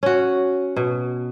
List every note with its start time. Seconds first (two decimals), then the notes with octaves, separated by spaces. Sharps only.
0.03 C#4 F#4
0.76 B2